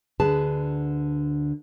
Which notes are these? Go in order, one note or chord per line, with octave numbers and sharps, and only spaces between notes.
D2 D3 G#4 B4 A5